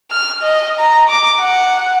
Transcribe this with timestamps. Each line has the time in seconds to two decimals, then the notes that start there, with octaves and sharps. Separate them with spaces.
0.11 F6
0.42 D#5
0.79 A#5
1.09 D6
1.40 F#5